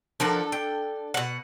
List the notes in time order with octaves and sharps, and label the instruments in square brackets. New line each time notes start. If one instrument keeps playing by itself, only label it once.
[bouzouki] F3 A#4 F#5 [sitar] D4 A4
[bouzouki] G5
B2 F#5